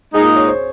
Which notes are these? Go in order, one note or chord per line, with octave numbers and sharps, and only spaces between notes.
A#2 G#3 D#4 G#4
G#4
C#5
C5